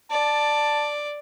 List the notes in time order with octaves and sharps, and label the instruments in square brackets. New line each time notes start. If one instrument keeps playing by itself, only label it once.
[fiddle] D5 [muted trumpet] A5